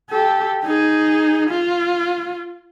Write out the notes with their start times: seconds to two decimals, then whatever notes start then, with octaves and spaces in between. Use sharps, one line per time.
0.10 G4 A4
0.63 D#4 G#4
1.50 F4